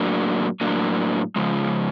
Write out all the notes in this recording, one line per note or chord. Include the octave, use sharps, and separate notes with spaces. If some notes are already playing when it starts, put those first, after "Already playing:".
Already playing: A2 F#3 A#3 D4
A2 F#3 A#3 D4
C#3 F3 G#3